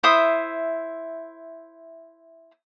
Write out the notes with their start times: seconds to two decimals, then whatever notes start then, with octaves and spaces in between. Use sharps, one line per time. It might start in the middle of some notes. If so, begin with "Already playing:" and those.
0.03 E4 C5 E5 D#6